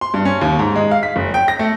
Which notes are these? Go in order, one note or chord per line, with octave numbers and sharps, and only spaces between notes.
C6
G2
C#4
D#2
G#2
G#3
F5
B6
F#1
G5
A#6
A3